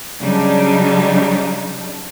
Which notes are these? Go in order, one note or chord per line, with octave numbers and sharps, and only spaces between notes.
C#3 F#3 G3 D4 D#4